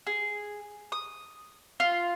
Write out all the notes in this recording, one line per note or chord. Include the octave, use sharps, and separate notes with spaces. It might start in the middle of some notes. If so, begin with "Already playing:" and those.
G#4
D#6
F4